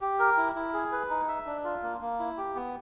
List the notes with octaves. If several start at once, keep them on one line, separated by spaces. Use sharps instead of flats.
G4
A#4
E4
E4
G#4
B4
D#4
E5
D4
F4
A#3
A#3
E4
G4
B3